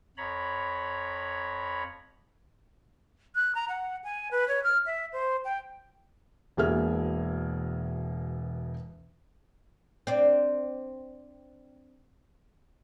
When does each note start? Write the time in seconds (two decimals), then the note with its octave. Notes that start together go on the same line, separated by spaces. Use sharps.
0.17 F2 C#5 A#5 B5
3.35 F#6
3.55 A#5
3.69 F#5
4.04 G#5
4.31 B4
4.48 C#5
4.64 F6
4.86 E5
5.13 C5
5.45 G5
6.57 E1 B2 A#3 G#4 E5 F6
10.07 C4 D4